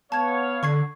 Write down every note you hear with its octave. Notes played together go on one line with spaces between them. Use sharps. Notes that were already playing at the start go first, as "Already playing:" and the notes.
B3 C#5 F5 A5 G#6
D3 C#6 G#6 C7